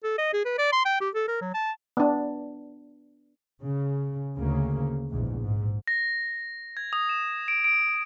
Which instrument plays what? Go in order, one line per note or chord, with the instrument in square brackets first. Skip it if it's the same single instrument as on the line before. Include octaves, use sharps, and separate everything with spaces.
[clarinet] A4
D#5
G#4
B4
D5
C6
G5
G4
A4
A#4
F#3
A5
[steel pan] B3 D4
[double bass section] C#3
D2 C#3 A#3
A#1 E2 G#2
G#2
[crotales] A#6
G#6
D#6
E7
D7
D7